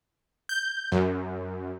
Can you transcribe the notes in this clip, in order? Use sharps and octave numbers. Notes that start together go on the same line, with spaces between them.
G6
F#2